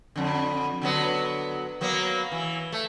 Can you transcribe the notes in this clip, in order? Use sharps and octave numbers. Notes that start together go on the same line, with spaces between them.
F2 D3
D3 F#3 B3
F#3 A#3 B3
E3
A3